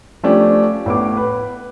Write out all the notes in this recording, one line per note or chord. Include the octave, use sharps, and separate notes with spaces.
F3 A3 C#4 D4 G4
A2 B3 D6
B4